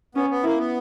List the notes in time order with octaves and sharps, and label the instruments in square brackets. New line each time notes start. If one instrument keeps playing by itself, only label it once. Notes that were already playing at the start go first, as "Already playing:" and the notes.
[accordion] B3 [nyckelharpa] C#4
[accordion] B3
[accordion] A#3 [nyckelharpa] E4
[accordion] B3